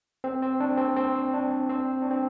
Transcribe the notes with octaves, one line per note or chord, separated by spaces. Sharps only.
C4
C4
D4
C4
C4
D4
C4
D4
C4